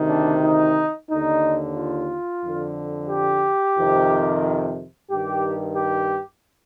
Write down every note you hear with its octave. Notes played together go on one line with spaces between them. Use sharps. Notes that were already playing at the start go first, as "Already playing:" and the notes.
Already playing: D2 C3 D#3
D4
D#4
D#2 D3 D#4
F4
F2 D3
G4
F2 C3 D#3
G2 D#3 G4
G4